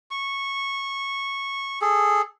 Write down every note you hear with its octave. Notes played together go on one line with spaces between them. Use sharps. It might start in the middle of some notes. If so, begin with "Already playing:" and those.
C#6
G#4 A4